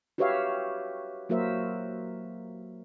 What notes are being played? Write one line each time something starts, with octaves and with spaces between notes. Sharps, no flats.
F#4 G4 B4 C#5 E5 F5
F#3 A#3 F#4 A#4 C5 E5